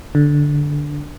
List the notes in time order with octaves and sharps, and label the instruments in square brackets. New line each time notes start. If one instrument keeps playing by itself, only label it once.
[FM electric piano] D3